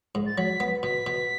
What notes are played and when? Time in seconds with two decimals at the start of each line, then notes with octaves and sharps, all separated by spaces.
0.15 G#2
0.26 A6
0.37 F#3 B6
0.60 B3
0.83 B2 B6
1.07 B2